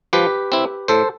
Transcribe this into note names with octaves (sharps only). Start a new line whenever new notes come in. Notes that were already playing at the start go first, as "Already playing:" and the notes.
F3 G4 B4
C4 E4
A2 A4 C5